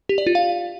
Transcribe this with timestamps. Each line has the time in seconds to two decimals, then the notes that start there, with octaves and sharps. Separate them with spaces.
0.09 G4
0.18 D5
0.27 F4
0.35 F5